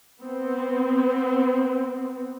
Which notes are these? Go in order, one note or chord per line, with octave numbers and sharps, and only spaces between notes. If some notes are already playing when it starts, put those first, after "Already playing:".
B3 C4